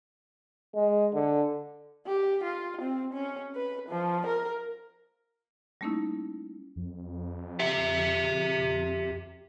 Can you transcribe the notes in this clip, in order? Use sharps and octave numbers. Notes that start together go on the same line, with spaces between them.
G#3
D3
G4
F4
C4
C#4
B4
F3
A#4
G3 A3 A#3 C#4 D#4 E4
F2
G4 E5